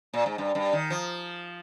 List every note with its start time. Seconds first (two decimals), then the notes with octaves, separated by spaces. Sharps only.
0.14 A#2
0.26 G#2
0.38 G2
0.55 G2
0.73 D#3
0.90 F3